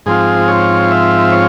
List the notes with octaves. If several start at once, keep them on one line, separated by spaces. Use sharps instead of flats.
G#2 F3 C4 F4 G#4
C#5
E5
C#5